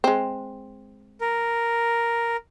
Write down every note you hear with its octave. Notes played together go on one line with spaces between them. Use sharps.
G#3 C4
A#4